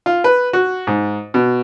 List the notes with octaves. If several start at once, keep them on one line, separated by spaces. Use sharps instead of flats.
F4
B4
F#4
G#2
B2